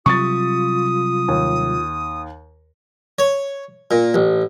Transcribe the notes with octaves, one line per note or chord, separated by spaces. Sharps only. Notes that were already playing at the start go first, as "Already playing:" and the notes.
C3 F#3 G3 F4 C#6 D#6 A6
D#2
C#5
A#2
A1